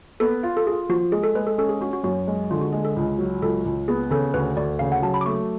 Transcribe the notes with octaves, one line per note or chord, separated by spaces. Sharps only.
B3 A4
F4
A4
F4 G#4
F3 F#4
G#3 G#4
A4
G#3 B4
A4
C#4 A4
G#4
C#4 F#4
F#4
F#2 F#4
G#3
D3 F4
F#4
G#3 G#4
A4
C#2
F#3
C#2 A4
C#2
B3 G#4
C#3 A4
D2 B4
D2 D5
C#3 F5
F#5
F#3 A5
B5
D6
A3 C#6